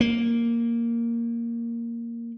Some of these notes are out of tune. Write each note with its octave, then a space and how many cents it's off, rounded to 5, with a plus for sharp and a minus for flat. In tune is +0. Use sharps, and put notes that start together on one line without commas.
A#3 +0